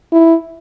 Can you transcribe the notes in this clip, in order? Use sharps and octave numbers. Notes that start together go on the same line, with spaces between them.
E4